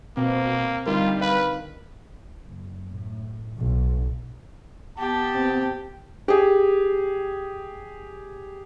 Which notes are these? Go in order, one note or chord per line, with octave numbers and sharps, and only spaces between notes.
B2 A#3 C4
D3 G3 D#4 F4 A#4
B4 F5
F#1
A2
B1
B3 G4 A5
C3
G4 G#4